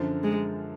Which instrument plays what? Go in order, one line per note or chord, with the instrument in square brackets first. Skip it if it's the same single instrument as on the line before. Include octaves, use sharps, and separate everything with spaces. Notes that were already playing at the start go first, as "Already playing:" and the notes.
Already playing: [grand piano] F#2 D3 F3
[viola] G#3